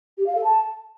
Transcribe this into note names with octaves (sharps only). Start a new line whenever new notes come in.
G4
F5
A4
A5